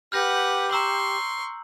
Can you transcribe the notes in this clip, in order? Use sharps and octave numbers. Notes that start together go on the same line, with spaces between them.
G4 B4 F#5 F6 G6 A#6
A#5 C6 C#6 E6 F#7